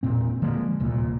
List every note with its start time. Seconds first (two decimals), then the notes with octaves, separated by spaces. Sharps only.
0.03 E1 A#2 C4
0.42 D3 F3 G#3 A#3
0.80 D1 C2 A#2